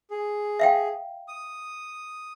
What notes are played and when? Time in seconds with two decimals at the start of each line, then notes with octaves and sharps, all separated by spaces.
0.11 G#4
0.60 E5 F5 G5
1.28 D#6